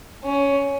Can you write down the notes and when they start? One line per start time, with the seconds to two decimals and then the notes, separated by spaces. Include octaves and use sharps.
0.24 C#4